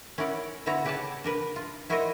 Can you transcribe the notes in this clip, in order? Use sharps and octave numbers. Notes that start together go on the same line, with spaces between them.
C#4 E4 A#4 D5 F#5
D3 B3 E4 F#4 A#5
C#3 G4 B4 F#5 G#5 A5
D4 A#4 B4
F4
E4 F#4 A#4 C5 C#5 D#5